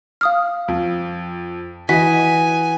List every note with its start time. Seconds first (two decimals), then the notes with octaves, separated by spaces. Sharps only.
0.21 F5 D#6 F6
0.68 F2
1.89 E3 F#4 D#5 G#5 B6